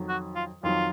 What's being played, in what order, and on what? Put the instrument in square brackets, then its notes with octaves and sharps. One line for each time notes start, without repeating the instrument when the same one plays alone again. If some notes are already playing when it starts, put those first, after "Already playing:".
Already playing: [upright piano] F2 D#3 F#3
[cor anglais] F#4
F4
[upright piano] F2 D#3 F#3 [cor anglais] F4